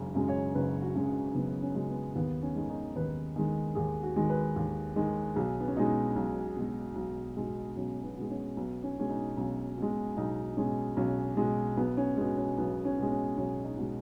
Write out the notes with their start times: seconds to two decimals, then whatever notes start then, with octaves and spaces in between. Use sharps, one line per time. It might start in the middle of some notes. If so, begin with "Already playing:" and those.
Already playing: F#1 F#2 C#3 G#3
0.15 F#2 C#3 G#3
0.28 C#5
0.55 F#1 B4
0.82 F#4
0.95 F#2 C#3 G#3
1.08 F#4
1.35 F#1 B3
1.62 C#4
1.75 F#2 C#3 G#3
1.89 B3
2.16 D#2 B3
2.43 C#4
2.55 D#3 G#3
2.69 D#4
2.96 D#2 B4
3.36 D#3 G#3
3.75 D#2 G#4
4.03 F#4
4.16 D#3 G#3
4.30 B4
4.56 D#2
4.96 D#3 G#3
5.36 B1 G#4
5.60 B3
5.68 C#4
5.76 B2 G#3 D#4
6.16 B1
6.57 B2 G#3
6.96 B1
7.37 B2 G#3
7.76 B1 C#4
8.03 B3
8.17 B2 G#3
8.31 C#4
8.57 B1 B3
8.83 C#4
8.97 B2 G#3 C#4
9.10 D#4
9.36 B1 C#4
9.78 B2 G#3
10.17 B1 D#4
10.57 B2 G#3 C#4
10.97 B1 C#4
11.37 B2 G#3
11.77 B1 B3
11.97 C#4
12.17 B2 G#3 B3
12.37 C#4
12.57 B1 B3
12.85 C#4
12.98 B2 G#3
13.11 C#4
13.38 B1 C#4
13.64 D#4
13.78 B2 G#3